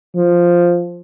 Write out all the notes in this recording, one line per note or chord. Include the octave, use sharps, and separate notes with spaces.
F3